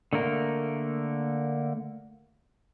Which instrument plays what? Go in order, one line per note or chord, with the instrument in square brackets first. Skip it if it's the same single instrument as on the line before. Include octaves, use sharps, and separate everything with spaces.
[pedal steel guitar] D3 A3 A#3 A#4